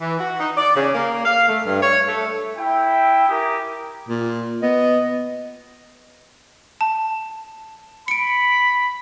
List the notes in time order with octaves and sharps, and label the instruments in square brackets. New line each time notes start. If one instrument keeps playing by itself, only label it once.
[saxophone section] E3
F#4
D#4
D5
C#3
A#3
F5
A3
G2
C#5
A3
[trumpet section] E4 G5
G4 A#4 G#5 D#6
[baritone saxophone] A#2
[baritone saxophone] B3 [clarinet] D#5
[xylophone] A5
[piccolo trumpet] B5 [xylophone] C#7 D7